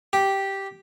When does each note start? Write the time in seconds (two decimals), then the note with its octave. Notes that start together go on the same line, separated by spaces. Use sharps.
0.13 G4